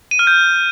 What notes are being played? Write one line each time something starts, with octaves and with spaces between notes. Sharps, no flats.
D#7
F6
G6